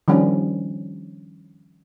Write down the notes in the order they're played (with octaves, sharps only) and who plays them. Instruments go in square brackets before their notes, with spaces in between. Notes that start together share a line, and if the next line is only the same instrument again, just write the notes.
[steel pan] D#3 F3 G3 C#4 D4